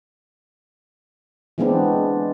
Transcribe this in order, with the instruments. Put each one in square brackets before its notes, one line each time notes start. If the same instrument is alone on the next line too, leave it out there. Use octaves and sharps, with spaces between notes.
[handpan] E3 G#3 B3 C4 D4